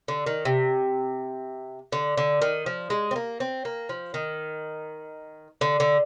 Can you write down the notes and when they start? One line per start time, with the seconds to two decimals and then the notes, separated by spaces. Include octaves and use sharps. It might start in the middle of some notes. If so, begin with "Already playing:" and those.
0.08 D3
0.26 D#3
0.45 C3
1.92 D3
2.17 D3
2.42 D#3
2.66 F3
2.90 G#3
3.11 C4
3.16 A#3
3.40 C4
3.65 A#3
3.89 F3
4.14 D#3
5.61 D3
5.80 D3